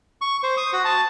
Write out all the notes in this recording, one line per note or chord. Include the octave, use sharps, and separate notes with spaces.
C#6
C5
D#6
F#4
A5